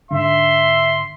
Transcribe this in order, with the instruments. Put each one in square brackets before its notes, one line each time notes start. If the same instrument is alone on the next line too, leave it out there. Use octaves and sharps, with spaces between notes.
[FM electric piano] G#2 D3 [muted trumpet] E5 [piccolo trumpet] C6